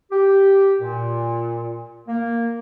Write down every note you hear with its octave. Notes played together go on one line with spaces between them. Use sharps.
G4
A#2
A#3